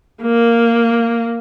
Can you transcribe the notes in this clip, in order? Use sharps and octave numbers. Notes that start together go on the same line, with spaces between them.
A#3